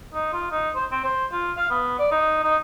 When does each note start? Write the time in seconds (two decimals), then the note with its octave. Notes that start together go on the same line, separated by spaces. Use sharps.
0.14 D#4
0.33 F4
0.51 D#4
0.75 C5
0.91 C4
1.04 C5
1.32 F4
1.57 F5
1.70 B3
1.99 D5
2.11 D#4
2.43 D#4